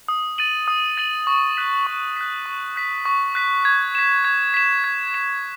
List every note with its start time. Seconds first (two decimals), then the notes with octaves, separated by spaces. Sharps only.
0.08 D#6
0.38 A6 D#7 F#7
0.68 D#6
0.97 A6 D#7 F#7
1.27 C#6
1.57 F#6 B6
1.87 C#6
2.16 F#6 B6
2.46 C#6
2.76 F#6 B6
3.05 C#6
3.35 F#6 B6
3.65 G#6
3.95 B6 E7
4.25 G#6
4.54 B6 E7
4.84 G#6
5.14 B6 E7